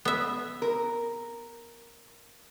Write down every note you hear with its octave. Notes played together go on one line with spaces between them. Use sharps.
B3 E5
A#4